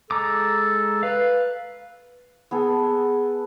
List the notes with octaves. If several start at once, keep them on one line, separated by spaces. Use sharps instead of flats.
G#3 A4 A#5 D6
B4 F5
B3 G#4 A4